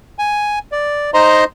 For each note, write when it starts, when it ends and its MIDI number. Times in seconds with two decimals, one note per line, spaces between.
0.19 0.59 80
0.72 1.11 74
1.14 1.44 63
1.14 1.44 72
1.14 1.44 75
1.14 1.44 82
1.14 1.44 84